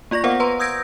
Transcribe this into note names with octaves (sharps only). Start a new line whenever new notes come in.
A#3 F4 D5 C#6 A#6
B3 A#4 C5 F5 F#5
B4 A#5 C6
D#6 E6 G6 G#6 A#6 D7